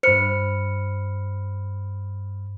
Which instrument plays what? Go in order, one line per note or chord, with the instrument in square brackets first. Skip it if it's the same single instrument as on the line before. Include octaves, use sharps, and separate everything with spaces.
[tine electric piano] G2 B5 F6 [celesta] C5 C#7